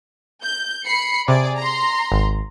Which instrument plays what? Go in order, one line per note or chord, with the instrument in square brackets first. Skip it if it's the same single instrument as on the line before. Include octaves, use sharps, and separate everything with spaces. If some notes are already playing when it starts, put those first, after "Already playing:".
[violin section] G6
B5 C7 C#7
[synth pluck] C3 [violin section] G#4 D5
[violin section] A#5 C6
[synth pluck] G#1